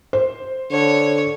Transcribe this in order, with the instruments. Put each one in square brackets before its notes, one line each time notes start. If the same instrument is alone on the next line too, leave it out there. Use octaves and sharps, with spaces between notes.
[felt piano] C5
[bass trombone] D3 [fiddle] C#5